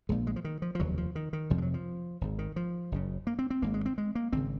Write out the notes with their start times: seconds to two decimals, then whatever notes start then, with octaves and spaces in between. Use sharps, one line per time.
0.09 A#1 A#2 G#3
0.27 G#3
0.36 F3
0.44 D#3
0.62 F3
0.75 F3
0.79 F1 D#2 C#3 F#3
0.98 F3
1.15 D#3
1.33 D#3
1.50 F1 F2 C3 F3
1.58 G#3
1.62 F#3
1.74 F3
2.21 G#1 G#2
2.39 D#3
2.56 F3
2.92 F#1 F#2 C#3
3.27 A#3
3.39 C4
3.50 C4
3.62 G#1 G#2 A#3
3.74 G#3
3.86 C4
3.98 G#3
4.15 A#3
4.32 G#1 C#3 C4